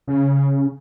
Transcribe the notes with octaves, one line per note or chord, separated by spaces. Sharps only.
C#3